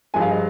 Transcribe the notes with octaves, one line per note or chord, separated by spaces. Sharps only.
G2 F3 G#3 G#5
F5
D#5